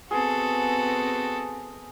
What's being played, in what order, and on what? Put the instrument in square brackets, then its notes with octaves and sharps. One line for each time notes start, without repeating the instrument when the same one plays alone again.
[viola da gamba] B3 C4 [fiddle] F#4 A4 [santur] G#4